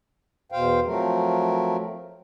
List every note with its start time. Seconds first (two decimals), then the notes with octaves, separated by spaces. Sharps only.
0.52 E2 B2 C5 F5 G5
0.86 F3 F#3 A3 C4 A#4